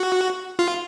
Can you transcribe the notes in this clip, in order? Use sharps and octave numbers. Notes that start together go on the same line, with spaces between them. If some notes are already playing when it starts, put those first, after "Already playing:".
Already playing: F#4
F4